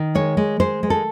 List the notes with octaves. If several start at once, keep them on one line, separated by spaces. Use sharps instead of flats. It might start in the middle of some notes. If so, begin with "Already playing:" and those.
Already playing: D#3
G#3 C#5
G#3
G#3 C5
G#3
A4